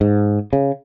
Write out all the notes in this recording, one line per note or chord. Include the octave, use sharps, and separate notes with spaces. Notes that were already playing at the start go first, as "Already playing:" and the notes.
G#2
C#3